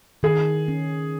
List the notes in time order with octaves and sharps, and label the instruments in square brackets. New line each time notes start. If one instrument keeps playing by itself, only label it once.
[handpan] D#3 [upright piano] G#4
[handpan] C#4